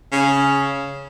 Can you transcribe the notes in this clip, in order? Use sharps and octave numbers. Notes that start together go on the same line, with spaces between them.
C#3